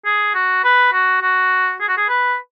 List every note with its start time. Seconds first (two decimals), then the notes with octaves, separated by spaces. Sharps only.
0.06 G#4
0.35 F#4
0.64 B4
0.93 F#4
1.22 F#4
1.81 G#4
1.89 F#4
1.97 G#4
2.09 B4